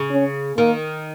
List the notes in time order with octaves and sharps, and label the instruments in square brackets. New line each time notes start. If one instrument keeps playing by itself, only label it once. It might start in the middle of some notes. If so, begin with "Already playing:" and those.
Already playing: [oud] C#3
[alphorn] C#4
[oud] D#3 [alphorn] A#3